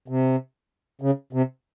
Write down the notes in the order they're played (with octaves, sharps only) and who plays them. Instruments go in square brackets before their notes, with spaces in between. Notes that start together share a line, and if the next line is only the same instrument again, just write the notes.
[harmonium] C3
C#3
C3